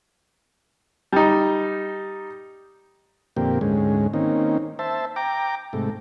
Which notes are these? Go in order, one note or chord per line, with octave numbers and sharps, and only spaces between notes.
G3 D#4
F2 A#2 D3 A#3 C4 G4
D2 G#2 G#3 C#4
D#3 A#3 C4 C#4 D#4
C5 E5 A5
G5 A#5 D6
G#2 C3 A3